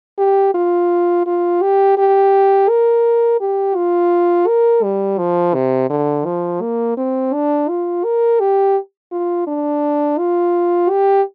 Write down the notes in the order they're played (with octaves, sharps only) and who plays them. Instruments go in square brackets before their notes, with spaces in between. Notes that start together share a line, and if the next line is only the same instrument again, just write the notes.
[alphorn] G4
F4
F4
G4
G4
A#4
G4
F4
A#4
G3
F3
C3
D3
F3
A#3
C4
D4
F4
A#4
G4
F4
D4
F4
G4